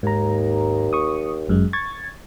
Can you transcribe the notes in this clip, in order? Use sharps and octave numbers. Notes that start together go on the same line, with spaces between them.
D#2 G#2 A#5
C#6 D#6
G1 F#2 G#3
C#6 G#6 A6